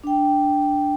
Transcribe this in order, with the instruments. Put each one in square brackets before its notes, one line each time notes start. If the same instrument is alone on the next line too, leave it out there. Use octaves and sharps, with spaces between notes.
[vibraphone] D4 G5